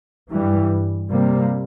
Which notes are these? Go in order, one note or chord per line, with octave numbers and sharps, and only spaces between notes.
G2 E3 G3
C3 G3 A#3